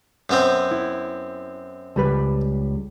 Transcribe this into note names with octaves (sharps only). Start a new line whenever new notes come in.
F#2 B3 C4
E4
C#2 G3 B4